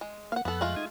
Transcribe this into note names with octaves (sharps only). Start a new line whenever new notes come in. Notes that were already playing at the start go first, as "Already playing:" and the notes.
G#3
A#3 F5 F#5
F2 B3 A4 F#6
G#3 A3 F4
D#4 D#6 G#6